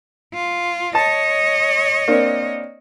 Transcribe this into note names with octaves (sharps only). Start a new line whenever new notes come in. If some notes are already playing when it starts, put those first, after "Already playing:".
F4
C#5 D#5 A5
A#3 C4 D4